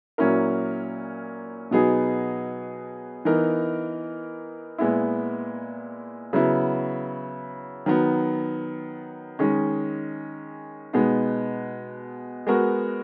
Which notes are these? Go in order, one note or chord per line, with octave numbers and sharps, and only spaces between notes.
A#2 F#3 C#4 E4 A#4
B2 F#3 B3 D#4 G#4
E3 B3 D#4 A#4
A#2 G#3 B3 E4
C#3 F#3 B3 E4
D#3 F#3 B3
D#3 G#3 C#4
B2 G#3 B3 D#4
G#3 B3 F#4 A#4